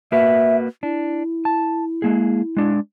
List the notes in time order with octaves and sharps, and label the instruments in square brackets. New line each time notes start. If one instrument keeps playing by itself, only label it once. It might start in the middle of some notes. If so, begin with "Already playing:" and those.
[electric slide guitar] A#3 F#4 B4 [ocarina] E5
[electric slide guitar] D4 [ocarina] E4
[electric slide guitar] A5
G#3 A#3 G#4
G#3 D4